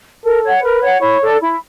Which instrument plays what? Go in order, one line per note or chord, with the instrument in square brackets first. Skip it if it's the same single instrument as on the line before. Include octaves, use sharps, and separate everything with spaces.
[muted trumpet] A4 [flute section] A#4
[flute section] C#5 F#5
[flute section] A#4 [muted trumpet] B4
[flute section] C#5 F#5
[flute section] E4 [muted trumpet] C#5
[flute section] A4 D5
E4